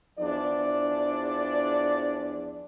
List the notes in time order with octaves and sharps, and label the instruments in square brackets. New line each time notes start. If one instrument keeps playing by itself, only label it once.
[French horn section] E2 F3 D4 D5